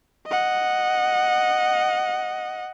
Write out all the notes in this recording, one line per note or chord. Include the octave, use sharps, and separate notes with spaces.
D#5 F#5